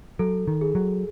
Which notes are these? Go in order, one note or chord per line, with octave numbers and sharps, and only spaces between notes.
F#3 A4
D#3
G#4
F#3